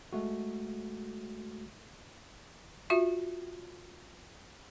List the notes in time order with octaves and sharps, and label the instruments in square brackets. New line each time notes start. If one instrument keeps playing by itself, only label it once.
[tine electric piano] G#3 A3 F#4
[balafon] F4 F#4 E5